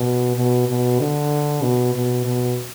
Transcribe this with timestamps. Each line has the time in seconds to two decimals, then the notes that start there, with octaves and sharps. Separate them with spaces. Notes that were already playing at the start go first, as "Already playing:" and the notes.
Already playing: B2
0.36 B2
0.68 B2
1.00 D3
1.63 B2
1.94 B2
2.25 B2